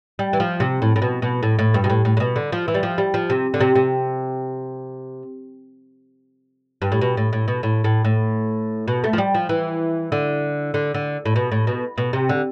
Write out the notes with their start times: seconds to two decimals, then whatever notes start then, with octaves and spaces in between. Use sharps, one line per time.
0.19 G3
0.33 E3
0.40 F3
0.60 C3
0.82 A2
0.96 A2
1.02 B2
1.22 B2
1.43 A2
1.59 A2
1.74 G2
1.84 B2
1.90 A2
2.05 A2
2.17 A2
2.20 B2
2.36 D3
2.52 F3
2.68 E3
2.74 G3
2.83 F3
2.98 G3
3.14 F3
3.30 C3
3.54 D3
3.61 C3
3.75 C3
6.82 G2
6.92 A2
7.01 B2
7.17 A2
7.33 A2
7.48 B2
7.63 A2
7.84 A2
8.05 A2
8.88 B2
9.04 A3
9.13 F3
9.18 G3
9.34 F3
9.49 E3
10.12 D3
10.74 D3
10.94 D3
11.26 A2
11.36 B2
11.52 A2
11.67 B2
11.98 B2
12.13 C3
12.29 D3